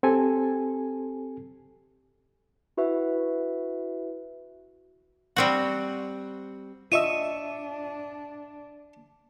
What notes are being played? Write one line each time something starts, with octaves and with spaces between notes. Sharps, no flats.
C4 G4 A4 G#5
E4 F#4 B4 E5
G3 C4 F#4
D4 F4 D#5 E5 C#6 E6 D#7